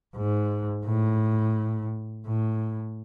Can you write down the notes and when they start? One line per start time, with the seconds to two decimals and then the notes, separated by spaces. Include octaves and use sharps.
0.16 G#2
0.86 A2
2.27 A2